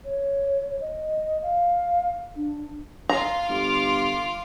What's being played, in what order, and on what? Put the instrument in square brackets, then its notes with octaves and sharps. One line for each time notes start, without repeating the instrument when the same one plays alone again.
[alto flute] C#5
D#5
F5
D4
[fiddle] F4 F5 [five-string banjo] A#5
[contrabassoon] G1 [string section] C6 D6 F6